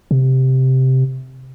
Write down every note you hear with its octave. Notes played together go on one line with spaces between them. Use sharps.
C3